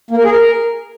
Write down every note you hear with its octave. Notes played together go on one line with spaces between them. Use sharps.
A#3
A#4
G#4
A#4